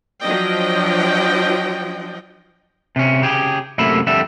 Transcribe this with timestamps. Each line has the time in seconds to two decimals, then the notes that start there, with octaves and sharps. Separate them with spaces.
0.22 F3 F#3 D4 D#5 G5
2.96 C3 C#4
3.22 C#3 G4 G#4
3.78 F#2 C3 A3 A#3 E5 B5
4.07 F2 D3 G3 E5